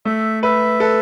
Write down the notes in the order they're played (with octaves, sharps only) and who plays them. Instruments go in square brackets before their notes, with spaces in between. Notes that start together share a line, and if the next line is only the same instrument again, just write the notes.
[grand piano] A3 [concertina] E5
[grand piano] B4 [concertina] E5
[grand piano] A4 [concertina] B4